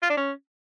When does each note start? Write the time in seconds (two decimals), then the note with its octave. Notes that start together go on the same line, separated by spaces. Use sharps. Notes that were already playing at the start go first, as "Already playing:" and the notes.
0.02 F4
0.10 D4
0.17 C#4